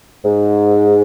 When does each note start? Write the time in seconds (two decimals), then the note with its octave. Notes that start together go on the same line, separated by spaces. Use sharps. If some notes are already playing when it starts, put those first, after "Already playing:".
0.25 G#2